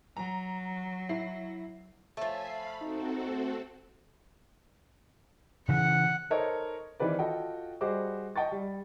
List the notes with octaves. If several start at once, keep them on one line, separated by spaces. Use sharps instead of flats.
F#3 A#5
E4 C7
F3 A3 C#5 E5 G#5
F5 B5 C7
C4 D#4 F#4 A4
A3
C#3 E3 F#5
D#4 A4 A#4 C5 C#5 D#5
D#3 E3 C4 B4 D5
F4 F#4 A4 D#5 G5
G3 F#4 G#4 C5 D#5 D6
D#5 G5 A5 C#6 A6
G3